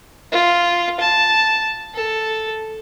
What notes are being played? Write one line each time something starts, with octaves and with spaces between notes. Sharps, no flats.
F4
A5
A4